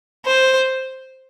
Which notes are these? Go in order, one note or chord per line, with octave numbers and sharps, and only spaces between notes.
C5